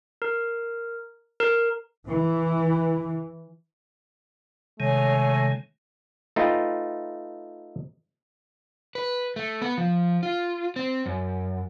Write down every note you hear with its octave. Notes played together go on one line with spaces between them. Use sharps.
A#4
A#4
E3
C3 D#3 G#3 A3 C#5 G#5
A3 D#4 F4 B4 G5
B4
A3
B3
F3
F4
C4
F#2